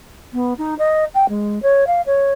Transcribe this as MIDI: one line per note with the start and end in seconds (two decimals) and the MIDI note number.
0.33 0.54 59
0.58 0.75 63
0.79 1.05 75
1.14 1.26 79
1.29 1.61 56
1.62 1.84 73
1.87 2.01 77
2.06 2.33 73